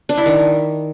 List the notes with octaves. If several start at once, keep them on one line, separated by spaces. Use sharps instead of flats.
D4
E4
D#3